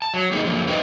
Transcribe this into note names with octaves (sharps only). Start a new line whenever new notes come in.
A5
F#3
A#3 D#4 G4 G#4 D5 D#5
D3 F3 F#3 A#3
D#4 F4 G4 B4 C5 D#5